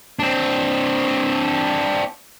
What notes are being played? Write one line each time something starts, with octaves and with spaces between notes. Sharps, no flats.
C4 D4